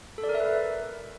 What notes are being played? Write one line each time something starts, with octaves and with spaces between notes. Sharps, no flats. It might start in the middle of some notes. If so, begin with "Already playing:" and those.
A4
D5
A#4
E5
B4